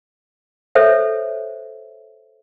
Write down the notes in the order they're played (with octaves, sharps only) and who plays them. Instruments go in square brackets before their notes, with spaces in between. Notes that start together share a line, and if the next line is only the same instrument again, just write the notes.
[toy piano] A4 C5 C#5 E5